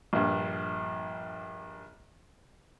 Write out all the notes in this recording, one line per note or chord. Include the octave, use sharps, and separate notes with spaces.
A#1 G2